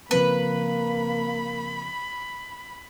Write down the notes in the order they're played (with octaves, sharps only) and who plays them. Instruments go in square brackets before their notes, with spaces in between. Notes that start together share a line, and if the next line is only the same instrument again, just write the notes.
[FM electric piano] C#3 F3 C4 [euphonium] A#3 [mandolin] B4 [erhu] B5